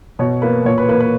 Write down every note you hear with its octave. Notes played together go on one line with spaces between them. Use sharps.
B2 C#5
A#3 B4
A#2 C#5
B4
A#3 B4
B4